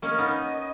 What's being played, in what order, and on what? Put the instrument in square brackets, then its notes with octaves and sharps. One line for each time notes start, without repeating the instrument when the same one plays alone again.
[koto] A#3 C#4 [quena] D#5
[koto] B3 D#4